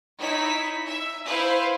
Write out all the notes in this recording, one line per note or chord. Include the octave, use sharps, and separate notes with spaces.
D#4 E4 C#5 B6
E5
E4 B4 C5 E5 F5